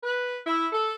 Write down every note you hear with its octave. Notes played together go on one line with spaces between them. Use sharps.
B4
E4
A4